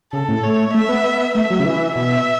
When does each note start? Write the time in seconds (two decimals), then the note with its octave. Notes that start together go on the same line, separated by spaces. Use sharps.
0.13 C#3 A4
0.28 A2
0.43 A3 C#5
0.74 A3 E5
0.89 B3
1.04 B3
1.35 A3 E5
1.50 F#3
1.60 C#3
1.65 E3
1.95 B2 E5